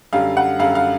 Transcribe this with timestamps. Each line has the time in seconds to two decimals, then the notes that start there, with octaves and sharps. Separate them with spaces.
0.13 F#2 D3 G3 F5
0.37 F#5
0.59 F#2 D3 G3 F5
0.75 F5